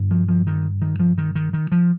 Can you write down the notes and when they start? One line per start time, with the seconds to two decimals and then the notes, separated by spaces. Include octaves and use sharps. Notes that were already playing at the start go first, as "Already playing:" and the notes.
Already playing: G2 D3
0.11 F3
0.29 F3
0.47 D#3
0.82 D#3
1.00 F3
1.18 D#3
1.35 D#3
1.53 D#3
1.72 F3